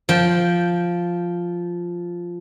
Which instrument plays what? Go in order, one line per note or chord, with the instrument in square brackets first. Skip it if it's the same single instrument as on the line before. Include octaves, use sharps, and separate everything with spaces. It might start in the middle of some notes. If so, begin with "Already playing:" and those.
[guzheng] F3 G5